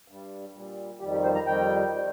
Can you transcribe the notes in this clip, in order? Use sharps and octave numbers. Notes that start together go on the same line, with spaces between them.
G2 G3
A#2 G3
F2 D#3 G3 G4
G4
C5
A#5
F2 D#3 G3 G5
D#3 G3